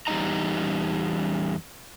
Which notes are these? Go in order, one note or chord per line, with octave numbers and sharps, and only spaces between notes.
E2 G3 A#3 D#4 D#5 A#5